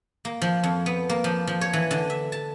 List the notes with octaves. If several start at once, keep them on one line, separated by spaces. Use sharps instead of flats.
A#3
F3
F2
B3
A#3
F3
F3
C#5
E3
D3
E5
A5